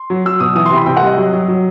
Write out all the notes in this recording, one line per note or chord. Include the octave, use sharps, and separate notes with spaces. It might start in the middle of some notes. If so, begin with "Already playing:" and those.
Already playing: C6
F#3
F#3 E6
B2 D#6
E3 D#6
C3 C6
B5
C3 G5
F#5
G3
D#5
F#3
F#3
F#3